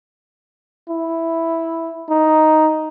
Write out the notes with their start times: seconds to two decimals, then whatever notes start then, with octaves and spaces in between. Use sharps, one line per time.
0.89 E4
2.10 D#4